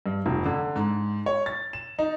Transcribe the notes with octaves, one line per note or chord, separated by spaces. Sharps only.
G2
F1
D3
G#2
C#5
A6
E7
D#4